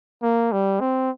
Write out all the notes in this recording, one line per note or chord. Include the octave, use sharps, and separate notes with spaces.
A#3
G3
C4